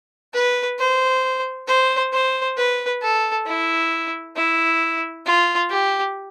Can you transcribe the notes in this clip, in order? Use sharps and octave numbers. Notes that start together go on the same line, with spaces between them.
B4
C5
C5
C5
B4
A4
E4
E4
F4
G4